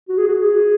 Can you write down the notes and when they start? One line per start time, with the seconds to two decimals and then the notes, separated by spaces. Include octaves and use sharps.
0.09 F#4
0.18 G#4
0.27 F#4
0.40 G#4